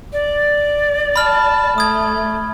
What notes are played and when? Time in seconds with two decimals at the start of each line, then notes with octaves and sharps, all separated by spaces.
0.13 D5
1.16 A5 B5 F6
1.78 A3 D#6 G#6